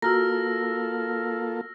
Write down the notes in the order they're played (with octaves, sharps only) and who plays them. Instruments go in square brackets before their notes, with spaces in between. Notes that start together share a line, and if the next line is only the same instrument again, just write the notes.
[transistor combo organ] A#3 F4 A4 [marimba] F#4 A#5 [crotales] E6 F6 A#6